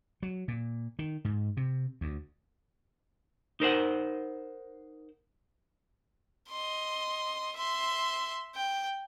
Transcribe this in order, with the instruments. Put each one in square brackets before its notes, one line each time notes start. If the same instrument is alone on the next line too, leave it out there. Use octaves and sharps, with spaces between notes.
[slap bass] F#3
A#2
D#3
G#2
C3
D2
[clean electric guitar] D#4 A#4 C5 F#5
[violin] D#5 C6
E5 C6
G5